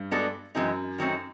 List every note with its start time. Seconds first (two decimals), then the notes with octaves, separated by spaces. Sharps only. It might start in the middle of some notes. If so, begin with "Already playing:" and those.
Already playing: G2
0.11 G#3 B3 D4 F#4 A4
0.55 F#2 E3 G#3 C4 D#4
0.98 D#3 F#3 A3 C4 D#4